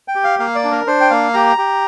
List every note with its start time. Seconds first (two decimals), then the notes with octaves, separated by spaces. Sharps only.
0.08 G5
0.15 G4
0.24 F5
0.39 A#3 F5
0.55 D5
0.64 D4
0.71 A#4
0.87 D4 C5
1.01 G5
1.10 A#3 F5
1.34 G4 A#5
1.58 G4